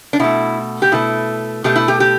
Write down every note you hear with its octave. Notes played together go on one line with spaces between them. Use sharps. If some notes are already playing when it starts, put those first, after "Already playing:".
D4
B2 A3 E4
G4
B2 A3 E4
B2 A3 G4
E4
G4
G4